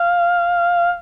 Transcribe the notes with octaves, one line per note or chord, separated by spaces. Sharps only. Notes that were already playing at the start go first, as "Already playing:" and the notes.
Already playing: F5